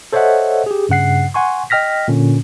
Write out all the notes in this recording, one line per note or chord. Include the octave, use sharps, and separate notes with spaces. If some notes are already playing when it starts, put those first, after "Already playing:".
A4 C5 C#5 D#5 E5 F#5
G4 G#4
G2 C#3 F#5 C7
F#5 G#5 C6 C#6
D#5 G5 F6 A#6 B6
A#2 D3 C#4